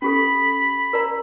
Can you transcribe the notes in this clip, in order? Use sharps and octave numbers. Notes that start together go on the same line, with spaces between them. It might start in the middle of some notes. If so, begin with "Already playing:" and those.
C#4 G4 A4 B5
A#4 D5 A#5